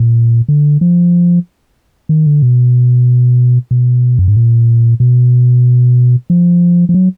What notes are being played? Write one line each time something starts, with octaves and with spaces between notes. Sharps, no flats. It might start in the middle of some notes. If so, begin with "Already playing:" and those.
Already playing: A#2
D3
F3
D#3
D3
B2
B2
F#2
G#2
A#2
B2
F3
F3
F#3